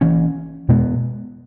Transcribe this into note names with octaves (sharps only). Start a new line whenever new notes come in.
E3 A#3 C#4
B2 G#3 B3